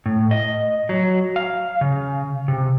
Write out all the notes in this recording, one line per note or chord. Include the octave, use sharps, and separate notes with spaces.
A2
D#5
F#3
F5
C#3
C3